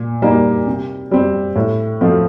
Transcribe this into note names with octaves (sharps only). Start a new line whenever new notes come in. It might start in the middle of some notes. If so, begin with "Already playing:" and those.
Already playing: A#2
G3 A#3 D#4
C3
G3 C4
A2
F3 A3 C4 F4